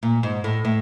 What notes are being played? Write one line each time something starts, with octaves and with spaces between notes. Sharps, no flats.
A#2
G#2
A2
A2